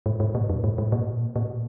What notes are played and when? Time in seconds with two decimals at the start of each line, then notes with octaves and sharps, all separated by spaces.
0.06 G#2
0.20 G#2
0.35 A#2
0.49 F#2
0.64 G#2
0.78 G#2
0.92 A#2
1.36 A#2